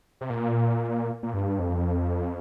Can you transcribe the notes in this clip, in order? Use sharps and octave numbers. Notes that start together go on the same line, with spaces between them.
C3
A#2
A#2
G2
F2